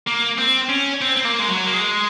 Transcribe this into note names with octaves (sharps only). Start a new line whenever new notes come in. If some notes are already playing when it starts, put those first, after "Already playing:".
A#3
C4
C#4
C4
C4
A#3
G#3
F#3
A#3
G#3